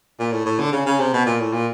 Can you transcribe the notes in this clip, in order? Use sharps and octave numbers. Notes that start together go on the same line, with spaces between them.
A#2
A2
A2
D3
C#3
C#3
C3
B2
A#2
A2
A#2